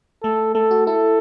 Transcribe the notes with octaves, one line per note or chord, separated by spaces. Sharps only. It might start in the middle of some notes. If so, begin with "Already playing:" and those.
A3 A4
A3 A4
F#4
E4 A4